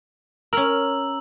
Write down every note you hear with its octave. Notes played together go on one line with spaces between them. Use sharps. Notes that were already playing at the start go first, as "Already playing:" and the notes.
C#4 A#4 A#5 E6 F#7